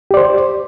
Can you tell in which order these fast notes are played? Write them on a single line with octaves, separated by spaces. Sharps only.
G4 D5 C5